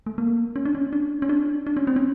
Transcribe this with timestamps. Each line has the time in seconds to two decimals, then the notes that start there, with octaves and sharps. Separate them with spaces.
0.06 A3
0.18 A#3
0.56 C#4
0.65 D4
0.75 C#4
0.93 D4
1.22 C#4
1.29 D4
1.67 D4
1.77 C#4
1.87 C4
1.96 C#4